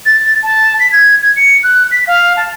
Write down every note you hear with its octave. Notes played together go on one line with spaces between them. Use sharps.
A6
A5
B6
G#6
G#6
C#7
F#6
B6
F5
A5